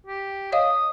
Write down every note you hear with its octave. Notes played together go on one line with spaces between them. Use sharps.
G4
C#5 D#5 F5 D#6